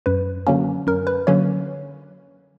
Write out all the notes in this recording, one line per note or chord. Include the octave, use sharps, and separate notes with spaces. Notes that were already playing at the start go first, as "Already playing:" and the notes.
F#2 B4
D3 F#3 A#3 C#4
F#2 A#4
B4
D3 F#3 A#3 C#4 C#5